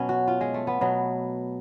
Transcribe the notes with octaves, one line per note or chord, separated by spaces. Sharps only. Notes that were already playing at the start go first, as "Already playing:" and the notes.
Already playing: B2 F#3 C#4
F#4
F4
G#3
A3
B3
B2 F#3